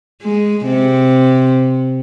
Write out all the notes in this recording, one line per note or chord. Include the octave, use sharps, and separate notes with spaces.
G#3
C3